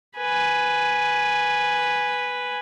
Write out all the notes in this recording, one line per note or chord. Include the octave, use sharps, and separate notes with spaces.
B4 G#5